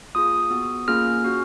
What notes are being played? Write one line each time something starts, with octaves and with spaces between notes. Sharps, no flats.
A#3 F4 G#4 D#6
B3 F#4
A#3 C#4 F4 G#4 F6
C#4 F#4